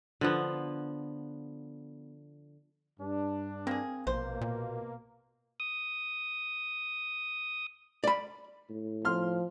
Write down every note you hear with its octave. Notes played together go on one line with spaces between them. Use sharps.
D3 F3 B3
G2 D4
A#3 C4 G#4
A#1 B2 A#3 C5
A#2
D#6
D5 B5
A2
F3 C6 F6